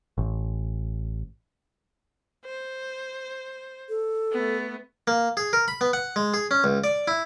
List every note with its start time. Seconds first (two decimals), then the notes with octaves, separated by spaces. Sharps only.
0.18 A1
2.45 C5
3.89 A4
4.32 A3 B3
5.07 A#3
5.37 G#4
5.53 A#4
5.68 B5
5.81 B3
5.93 F#5
6.16 G#3
6.34 G#4
6.51 C#4
6.64 C#2
6.84 D5
7.08 E4